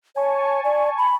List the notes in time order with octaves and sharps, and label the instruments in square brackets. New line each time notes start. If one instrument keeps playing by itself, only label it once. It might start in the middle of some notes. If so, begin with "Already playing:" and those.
[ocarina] C#5 [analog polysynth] G#5 A5 C#6
[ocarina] D5
B5